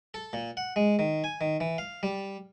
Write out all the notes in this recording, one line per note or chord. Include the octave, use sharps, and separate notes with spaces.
A4
A#2
F#5
G#3
D#3
G#5
D#3
E3
F5
G3